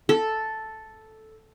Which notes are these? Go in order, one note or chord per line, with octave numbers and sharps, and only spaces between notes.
A4